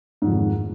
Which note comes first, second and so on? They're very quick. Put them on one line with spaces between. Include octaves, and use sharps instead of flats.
G#2 F2 D#3